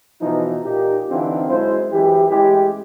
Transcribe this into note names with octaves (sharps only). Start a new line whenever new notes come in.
B2 E3 F3 D#4
A#2 D#4 G4
D3 E3 C4 D4 D#4 F4
F#2 G#3 E4 C5
F#2 E3 G#3 G4
A1 G#3 E4 G4